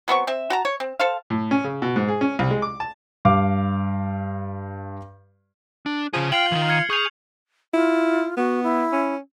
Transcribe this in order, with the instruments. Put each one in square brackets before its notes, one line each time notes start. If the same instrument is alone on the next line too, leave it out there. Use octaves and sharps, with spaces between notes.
[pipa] F#3 B3 C4 C#6
C4 E5
F#4 A5 A#5
C#5
C4
A4 C5 F5
[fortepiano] A2
C#4
C#3
B2
G#2
G#4
C#4
C2
G#3
D6
A5
[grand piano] G2 F5 D6
[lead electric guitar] D4
[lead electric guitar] C#3 G#4 [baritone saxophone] F3
[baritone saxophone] F4 [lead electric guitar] G5 [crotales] F6 C7 F#7
[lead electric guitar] D#3 E3
[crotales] F6 G#6 C#7
[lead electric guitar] G#4 [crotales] C#6 G6 F7
[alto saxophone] E4 [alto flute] F4
[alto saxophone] B3 [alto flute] F#4
[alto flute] E4
[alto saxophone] C#4